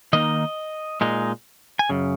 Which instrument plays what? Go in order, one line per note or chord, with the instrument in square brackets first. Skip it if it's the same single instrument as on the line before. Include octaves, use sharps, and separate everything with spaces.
[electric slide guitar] D#3 A#3 D#4 D#5
A#2 G#3 D#4
G#5
F#2 C#3